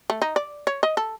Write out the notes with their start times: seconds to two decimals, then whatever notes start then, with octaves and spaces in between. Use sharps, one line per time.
0.10 A3
0.22 D#4
0.36 D5
0.67 C#5
0.83 D#5
0.97 A4